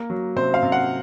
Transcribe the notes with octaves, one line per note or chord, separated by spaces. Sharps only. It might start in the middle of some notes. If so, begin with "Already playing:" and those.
Already playing: A#3
F#3
C3 C5
F5
C3
F#5